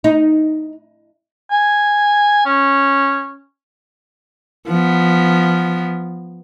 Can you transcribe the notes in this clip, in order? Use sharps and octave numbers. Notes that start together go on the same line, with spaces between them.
D#4
G#5
C#4
F3 B3